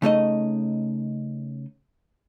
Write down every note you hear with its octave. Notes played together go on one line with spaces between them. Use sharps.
C#3 A3 D#4 D#5